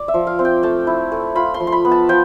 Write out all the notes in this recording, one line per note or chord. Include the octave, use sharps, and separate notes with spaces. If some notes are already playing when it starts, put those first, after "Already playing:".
Already playing: D5
E5
F3
F5
C4
G5
A3 A5
E4
A3
F4 B5
C6
F3
C6
B5
B3
A5
F3 G5